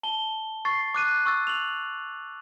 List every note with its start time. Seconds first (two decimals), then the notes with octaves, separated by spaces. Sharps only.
0.03 A5 G7
0.65 C#6 A6 C7
0.94 D6 F#6 D#7
1.26 C#6 E6 A6
1.47 F7 F#7